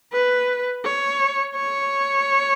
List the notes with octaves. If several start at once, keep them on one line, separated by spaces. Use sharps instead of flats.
B4
C#5
C#5